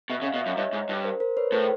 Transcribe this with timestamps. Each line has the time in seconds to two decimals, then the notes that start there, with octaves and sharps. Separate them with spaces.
0.10 B2 E5 F#5
0.22 C#3
0.26 D#5 F5
0.34 B2
0.41 F#2 D5 E5
0.57 G2 C#5 D#5
0.73 G#2
0.89 G2
1.04 A#4 C5
1.20 A#4 C5
1.37 B4 C#5
1.52 A2 A#4 C5